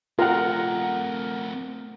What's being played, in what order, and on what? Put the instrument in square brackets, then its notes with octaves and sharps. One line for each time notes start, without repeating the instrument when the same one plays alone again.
[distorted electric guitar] A3 C4 [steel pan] F4 A#5 [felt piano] A#4 F#5